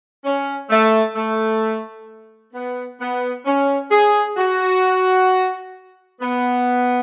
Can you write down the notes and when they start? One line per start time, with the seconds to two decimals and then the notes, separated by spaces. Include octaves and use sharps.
0.24 C#4
0.70 A3
1.16 A3
2.54 B3
2.99 B3
3.46 C#4
3.91 G#4
4.37 F#4
6.20 B3